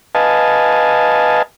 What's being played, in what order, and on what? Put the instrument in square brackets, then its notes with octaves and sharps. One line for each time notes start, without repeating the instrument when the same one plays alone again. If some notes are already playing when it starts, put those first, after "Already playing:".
[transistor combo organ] B4 D#5 F5 G#5 A5